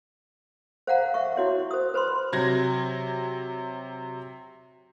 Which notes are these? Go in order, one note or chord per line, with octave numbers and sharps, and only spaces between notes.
C5 F5 F#5 A#5
E5 C#6
E4 F#4 C#5 E5
C5 D#6
B4 C5 B5 C6
C3 F#3 G#6 A#6